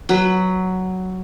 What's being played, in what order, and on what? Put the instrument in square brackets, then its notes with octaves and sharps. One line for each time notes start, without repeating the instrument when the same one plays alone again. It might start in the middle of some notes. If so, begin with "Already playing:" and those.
[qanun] F#3 B4